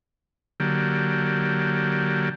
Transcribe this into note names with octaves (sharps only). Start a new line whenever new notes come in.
D3 F#3 A#3 G4